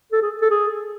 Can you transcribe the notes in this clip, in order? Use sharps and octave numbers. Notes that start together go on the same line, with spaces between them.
A4
G#4
A4
G#4